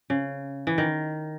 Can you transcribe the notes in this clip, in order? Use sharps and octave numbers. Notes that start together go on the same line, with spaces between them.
C#3
E3
D#3